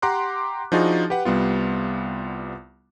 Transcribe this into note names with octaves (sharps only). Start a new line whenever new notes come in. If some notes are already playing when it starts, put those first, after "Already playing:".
G4 F#5 A#5 C6 D6 F#6
F3 D4 D#4 F4 F#4 G#4
G4 B4 F#5
C2 G3 B3 F4